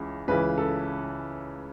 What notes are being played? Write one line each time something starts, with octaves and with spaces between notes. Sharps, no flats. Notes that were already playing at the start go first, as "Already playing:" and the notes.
Already playing: C#2 C#3 E3
C#2 C#3 E3 B4
A4